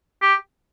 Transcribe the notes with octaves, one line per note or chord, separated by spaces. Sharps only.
G4